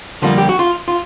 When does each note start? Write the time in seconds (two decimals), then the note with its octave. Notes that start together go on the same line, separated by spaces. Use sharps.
0.22 F2 D3 G3 A#3 F4
0.38 G4
0.49 F#4
0.59 F4
0.88 F4